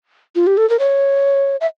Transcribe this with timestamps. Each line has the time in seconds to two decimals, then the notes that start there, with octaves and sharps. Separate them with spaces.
0.35 F4
0.47 G4
0.57 A4
0.70 A#4
0.79 C#5
1.61 E5